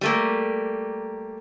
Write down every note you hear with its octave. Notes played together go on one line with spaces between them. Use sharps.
G3 A3 A#3